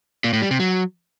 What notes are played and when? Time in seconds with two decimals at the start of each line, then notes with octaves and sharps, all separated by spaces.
0.24 A#2
0.33 A2
0.42 G3
0.51 C3
0.60 F#3